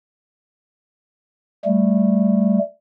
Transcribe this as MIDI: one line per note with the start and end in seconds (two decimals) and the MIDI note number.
1.65 2.58 55
1.65 2.58 57